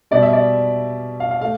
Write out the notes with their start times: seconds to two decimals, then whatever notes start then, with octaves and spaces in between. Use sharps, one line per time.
0.11 B2 G3 D5
0.23 E5
0.33 D5
1.20 F5
1.31 F5
1.41 A3 F5